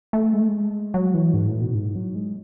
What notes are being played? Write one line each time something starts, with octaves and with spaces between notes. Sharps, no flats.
A3
G#3
A3
G#3
F#3
E3
G#2
A2
B2
G#2
F#3
G#3